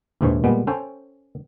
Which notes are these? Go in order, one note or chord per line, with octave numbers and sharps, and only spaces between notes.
A#1 D#2 G#2 E3 C5 C#5
A#2 G3 G#3 B3
C#4 A4 C5 G5 G#5